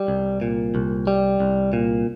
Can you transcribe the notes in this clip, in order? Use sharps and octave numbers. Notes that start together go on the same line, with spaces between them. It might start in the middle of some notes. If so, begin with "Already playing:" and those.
Already playing: G3
C2
A#2
C2
G3
C2
A#2